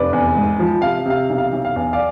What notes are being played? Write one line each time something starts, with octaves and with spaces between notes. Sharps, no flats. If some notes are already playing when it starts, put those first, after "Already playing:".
Already playing: F1 B4 D5
E2
G#2
F3
C3 F5
C3 F5
B1
F5
B1
F5
E2
D5 F5